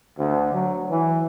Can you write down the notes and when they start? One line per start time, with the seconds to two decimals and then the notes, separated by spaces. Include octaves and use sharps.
0.18 D2
0.54 F#3
0.90 E3